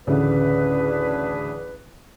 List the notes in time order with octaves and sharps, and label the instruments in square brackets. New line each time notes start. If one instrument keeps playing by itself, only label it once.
[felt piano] A1 D2 C#3 [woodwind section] D4 G#4 B4